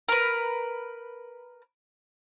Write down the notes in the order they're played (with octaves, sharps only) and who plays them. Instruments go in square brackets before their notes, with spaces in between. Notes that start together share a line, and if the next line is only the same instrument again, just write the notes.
[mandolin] A#4 B4